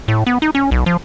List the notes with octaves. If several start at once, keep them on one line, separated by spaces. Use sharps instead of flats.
A2
B3
D#4
C#4
B1
F3